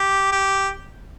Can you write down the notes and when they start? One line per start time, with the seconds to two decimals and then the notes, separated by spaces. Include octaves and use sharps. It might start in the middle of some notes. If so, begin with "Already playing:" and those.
Already playing: G4
0.32 G4